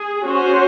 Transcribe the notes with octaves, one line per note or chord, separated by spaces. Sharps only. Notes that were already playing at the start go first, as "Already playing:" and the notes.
Already playing: G#4
C#4 F#4 C5